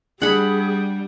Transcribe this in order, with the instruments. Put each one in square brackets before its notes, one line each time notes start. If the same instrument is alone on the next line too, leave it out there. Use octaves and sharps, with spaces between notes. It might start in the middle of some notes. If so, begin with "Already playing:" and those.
[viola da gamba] G3 [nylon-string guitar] D4 [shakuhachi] G#4 [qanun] F#5 B5